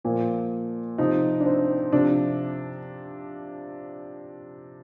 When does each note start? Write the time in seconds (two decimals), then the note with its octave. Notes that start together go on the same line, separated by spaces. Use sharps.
0.04 A#2 F3
0.98 C3 F3 D#4
1.40 D4
1.46 C4
1.92 C3 F3 D4